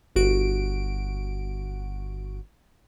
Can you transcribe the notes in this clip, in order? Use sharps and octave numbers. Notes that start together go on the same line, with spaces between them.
G1 F#4 D7